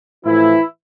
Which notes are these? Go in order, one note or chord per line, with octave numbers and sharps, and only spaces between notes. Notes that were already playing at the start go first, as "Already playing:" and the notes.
A2 E3 F3 E4